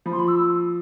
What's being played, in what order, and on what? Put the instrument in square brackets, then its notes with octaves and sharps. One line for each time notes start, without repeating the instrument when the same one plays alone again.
[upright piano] F3 [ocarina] B5
[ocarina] C6
B5
E6